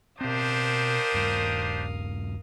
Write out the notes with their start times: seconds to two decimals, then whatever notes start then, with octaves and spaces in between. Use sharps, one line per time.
0.21 B2 C4 D4 G4 A#4 C5 F5 D#6
1.14 D#1 G2